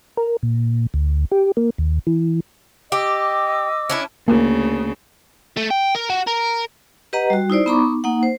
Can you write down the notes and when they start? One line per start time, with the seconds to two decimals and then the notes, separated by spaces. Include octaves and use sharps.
0.17 A#4
0.43 A#2
0.94 D2
1.32 G4
1.57 A#3
1.78 D#2
2.07 E3
2.92 G4 D#5 D6 E6
3.90 C#4 D4 E4
4.28 D2 C#3 A#3
5.57 A3
5.71 G5
5.95 A#4
6.10 F#4
6.27 A#4
7.13 G4 B4 D#5 F#5 A#5
7.30 G3 F#4
7.50 D#4 E4 C5 D5
7.66 B3 D#4 A#5 B5 C#6 D6
8.04 A#3 D#4 F#5
8.23 C5